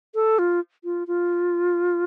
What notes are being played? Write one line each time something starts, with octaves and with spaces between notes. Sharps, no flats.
A4
F4
F4
F4